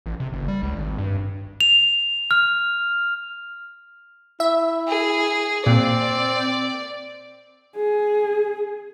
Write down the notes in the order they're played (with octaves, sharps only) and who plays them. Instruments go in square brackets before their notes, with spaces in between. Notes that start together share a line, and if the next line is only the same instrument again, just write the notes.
[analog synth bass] A1
C3
F#1
G3
C#2
G#1
G2
[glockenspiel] F7
F6
[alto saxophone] E4 [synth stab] E5
[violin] G#4
[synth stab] A#2 [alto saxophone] C4 [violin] D5
[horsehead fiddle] G#4